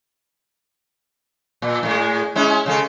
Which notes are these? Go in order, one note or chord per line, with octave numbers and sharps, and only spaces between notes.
A#2
A2 G#3
G#3 C#4 E4
C#3 G#3 A4